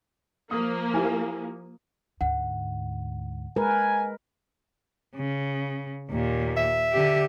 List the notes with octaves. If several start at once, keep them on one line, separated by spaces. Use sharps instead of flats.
F3 A#3 D#6
E4 G4 G#5
D2 G#2 F#5
G#3 A#4 B4 G#5
C#3
D#2 A#2
E5
D3 G4